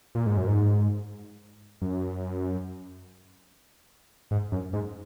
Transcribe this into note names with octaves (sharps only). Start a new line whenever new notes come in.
A#2
G#2
F#2
G#2
F#2
G#2
F#2
G#2